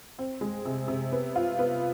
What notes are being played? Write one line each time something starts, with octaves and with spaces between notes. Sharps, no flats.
C4
G#3
C3
C3
B3
F4
B3